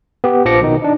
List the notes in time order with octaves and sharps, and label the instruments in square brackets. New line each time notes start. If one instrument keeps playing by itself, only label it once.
[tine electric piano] B3 G4
A#1 F3 D6 A#6 C#7
B2 D#3 D#4
D4 D#4